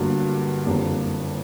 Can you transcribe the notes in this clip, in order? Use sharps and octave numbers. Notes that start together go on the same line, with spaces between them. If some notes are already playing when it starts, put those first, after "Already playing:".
Already playing: G1 G2 D3 F#3 A#3
F#1 F2 D3 G3 A#3